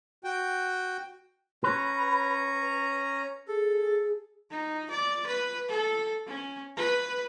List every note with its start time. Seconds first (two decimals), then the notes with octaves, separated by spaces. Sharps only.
0.24 F#4 G5
1.64 C#4 B4 A#5
3.48 G#4 A4
4.51 D#4
4.90 D5
5.26 B4
5.69 A4
6.27 C#4
6.77 B4